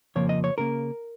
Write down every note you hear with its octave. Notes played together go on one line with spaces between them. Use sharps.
F2 C#3 F3 A#3 C#5
D#5
C#5
C#3 A#3 A#4